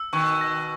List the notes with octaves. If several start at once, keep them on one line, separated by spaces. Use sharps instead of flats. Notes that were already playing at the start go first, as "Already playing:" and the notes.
Already playing: E6
B2 D#3 C#6
A#6